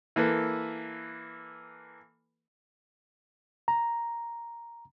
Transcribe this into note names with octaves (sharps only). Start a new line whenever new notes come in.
E3 A#3 A4 B4
A#5